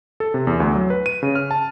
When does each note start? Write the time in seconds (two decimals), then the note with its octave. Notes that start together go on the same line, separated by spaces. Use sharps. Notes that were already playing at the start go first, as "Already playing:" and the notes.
0.20 A4
0.34 C3
0.47 E2
0.60 D2
0.75 F#3
0.90 B4
1.06 D#7
1.23 C#3
1.35 F6
1.51 A5